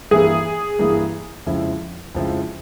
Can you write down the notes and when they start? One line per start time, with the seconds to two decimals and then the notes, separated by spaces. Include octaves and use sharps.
0.11 G2 E3 A#3 E4 G#4
0.79 G2 E3 A#3 E4
1.46 F2 C#3 F3 G#3 E4
2.15 F2 C#3 F3 G#3 E4